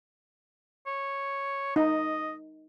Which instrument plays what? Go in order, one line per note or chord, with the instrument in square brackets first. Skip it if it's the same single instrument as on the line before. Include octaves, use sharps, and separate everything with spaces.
[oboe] C#5
[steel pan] D#4 [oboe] D#5